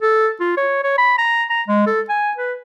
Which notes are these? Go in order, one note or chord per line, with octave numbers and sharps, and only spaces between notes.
A4
F4
C#5
C#5
B5
A#5
A#5
G#3
A4
G#5
B4